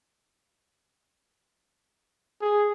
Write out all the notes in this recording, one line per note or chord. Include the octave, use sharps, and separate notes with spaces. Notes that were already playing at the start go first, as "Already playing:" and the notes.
G#4